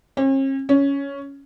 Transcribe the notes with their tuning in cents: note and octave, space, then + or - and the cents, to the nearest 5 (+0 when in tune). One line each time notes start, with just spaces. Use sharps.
C#4 -45
C#4 +10